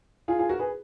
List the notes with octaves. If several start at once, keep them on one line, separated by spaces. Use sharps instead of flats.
F4 G#4
F4 G#4
F#4 A#4
G#4 B4